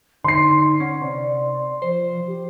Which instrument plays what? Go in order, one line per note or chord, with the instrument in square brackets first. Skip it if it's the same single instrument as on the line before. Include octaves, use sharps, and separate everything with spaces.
[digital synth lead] D3 [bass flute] D#4 [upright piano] C6 C7
[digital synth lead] C#4 [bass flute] F#5
[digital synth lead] C3 [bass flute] D5
[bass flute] F3 [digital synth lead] C5
[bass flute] G4